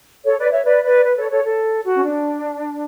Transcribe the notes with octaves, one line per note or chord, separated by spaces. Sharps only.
A4 C#5
B4 D5
C#5 E5
B4 D5
B4 D5
B4
A4 C#5
A4 C#5
A4
F#4
C#4
D4